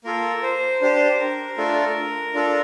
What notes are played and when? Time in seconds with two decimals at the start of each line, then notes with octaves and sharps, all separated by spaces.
0.04 A#3 F4 A4 A#4
0.43 C5
0.81 D4 G4 C5
1.19 A#4
1.57 A3 D4 F4 A4
2.34 D4 F4 A4